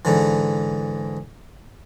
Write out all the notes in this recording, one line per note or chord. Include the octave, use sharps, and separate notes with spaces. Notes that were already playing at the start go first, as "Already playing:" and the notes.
G#2 D3 E3